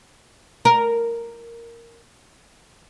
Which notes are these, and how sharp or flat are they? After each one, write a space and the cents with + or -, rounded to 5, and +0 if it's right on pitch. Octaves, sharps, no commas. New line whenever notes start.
A#4 -5